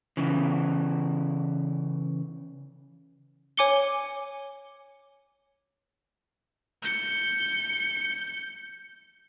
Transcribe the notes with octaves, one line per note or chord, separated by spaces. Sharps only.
C#3 E3
C#5 G#5 D6 C#7 G7
G6 C#7